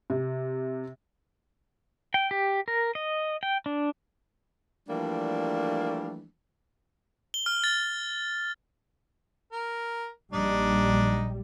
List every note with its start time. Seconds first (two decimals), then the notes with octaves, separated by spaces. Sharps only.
0.10 C3
2.14 G5
2.31 G4
2.68 A#4
2.95 D#5
3.43 G5
3.66 D4
4.89 E3 F3 G3 A3 A#3 D4
7.34 G7
7.46 F6
7.64 A6
9.52 A#4
10.33 A#1 G3 D4 D#4